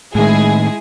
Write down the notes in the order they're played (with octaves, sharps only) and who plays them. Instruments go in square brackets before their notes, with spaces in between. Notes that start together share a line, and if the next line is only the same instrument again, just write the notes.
[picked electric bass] A2 D#3 [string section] G#3 E4 G#4